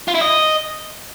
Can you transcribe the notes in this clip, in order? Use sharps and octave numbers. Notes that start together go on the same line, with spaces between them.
F4
E4
D#5